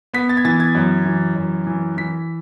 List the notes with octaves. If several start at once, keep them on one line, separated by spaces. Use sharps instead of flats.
B3 B6
A6
G#6
E3 A6
G#6
F#2
E3
F#2
E3
E3 B6